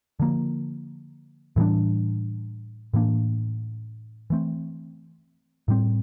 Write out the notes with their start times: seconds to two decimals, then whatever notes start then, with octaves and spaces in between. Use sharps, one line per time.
0.20 D3 F3 A#3
1.56 A2 E3 G3 D4
2.94 A2 E3 A#3 D4
4.30 E3 A3 C4
5.68 A2 G3 C4